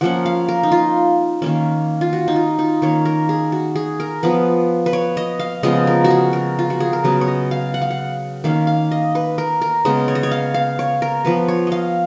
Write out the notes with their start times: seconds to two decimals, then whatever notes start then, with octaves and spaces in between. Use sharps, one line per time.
0.01 F3 A#3 C#4 F#5
0.26 F5
0.49 A#4
0.63 D#4
0.72 F4
1.42 D#3 A#3 C#4
2.01 F4
2.13 F#4
2.28 D#4
2.36 F4
2.59 D#4
2.82 D#3 A#3 C#4 C#5
3.05 A#4
3.29 G#4
3.52 F#4
3.76 G#4
4.00 A#4
4.23 F3 B3 B4
4.86 B4
4.93 C#5
5.17 D#5
5.39 F5
5.63 C#3 F3 G#3 B3 D#5
5.87 A#4
6.04 F#4
6.11 G#4
6.33 A#4
6.59 F4
6.70 F#4
6.80 G#4
6.93 A#4
7.04 C#3 F#3 B3 B4
7.21 C#5
7.28 D#5
7.51 F5
7.74 F#5
7.81 F5
7.90 F#5
8.44 D#3 A#3 C#4 F5
8.67 F5
8.92 D#5
9.15 B4
9.38 A#4
9.62 A#4
9.85 C#3 G#3 B3 D#5
10.08 C#5
10.15 D#5
10.23 C#5
10.31 F5
10.54 F5
10.79 C#5
11.02 A#4
11.25 F3 B3 B4
11.48 C#5
11.67 D#5 F5